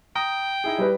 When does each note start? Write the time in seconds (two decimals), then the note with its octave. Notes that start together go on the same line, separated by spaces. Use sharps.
0.16 G5 A#5 D#6 A#6
0.64 D#4 E4 G#4
0.78 G3 B4